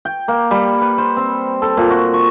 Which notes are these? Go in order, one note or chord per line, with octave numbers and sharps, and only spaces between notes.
G5
A#3
G3
B4
C5
C4
A4
A#2
F#4
C#6